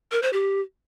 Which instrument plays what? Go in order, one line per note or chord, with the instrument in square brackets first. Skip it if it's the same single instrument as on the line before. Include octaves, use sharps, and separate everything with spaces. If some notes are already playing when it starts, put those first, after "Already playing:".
[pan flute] A#4
C5
G4